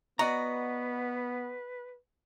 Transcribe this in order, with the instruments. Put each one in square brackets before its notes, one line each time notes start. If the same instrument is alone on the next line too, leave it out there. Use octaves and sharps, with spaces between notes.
[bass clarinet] B3 [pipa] F#4 [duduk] B4 [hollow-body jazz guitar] D5 D#5 A#5